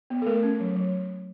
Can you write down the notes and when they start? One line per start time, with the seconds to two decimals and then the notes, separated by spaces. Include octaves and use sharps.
0.10 B3
0.22 A4
0.26 A3 A#4
0.43 C#4
0.60 F#3
0.76 F#3